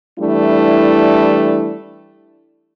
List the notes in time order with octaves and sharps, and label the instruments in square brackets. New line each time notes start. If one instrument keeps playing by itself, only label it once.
[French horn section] E3 G3 A3 D4 E4